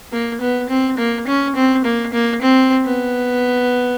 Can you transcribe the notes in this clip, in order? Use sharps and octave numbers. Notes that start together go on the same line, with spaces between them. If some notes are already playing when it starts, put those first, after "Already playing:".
A#3
B3
C4
A#3
C#4
C4
A#3
A#3
C4
B3